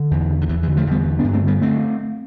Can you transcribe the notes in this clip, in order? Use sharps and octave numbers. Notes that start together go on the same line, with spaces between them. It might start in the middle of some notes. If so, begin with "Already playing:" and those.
Already playing: D3
E2
D3
D3
E2 E3
E3
D3
F3 A3
E2 G3 B3
D3
B3 D4
G2
A3 C4
D3 G3 B3
A3 C4